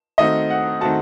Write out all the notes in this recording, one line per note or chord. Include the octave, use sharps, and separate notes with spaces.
D#3 A3 C4 F#4 D#5
F#5
D#3 A3 C4 F#4 A5